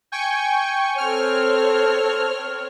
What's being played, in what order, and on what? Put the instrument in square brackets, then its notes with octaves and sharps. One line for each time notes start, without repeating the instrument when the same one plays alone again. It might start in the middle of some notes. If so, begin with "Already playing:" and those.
[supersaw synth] G5 G#5 C#6
[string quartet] C4 C#5 [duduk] A4 [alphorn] C5 [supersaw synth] F6